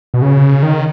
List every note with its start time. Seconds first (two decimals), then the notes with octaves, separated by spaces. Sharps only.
0.14 B2
0.22 C#3
0.63 D#3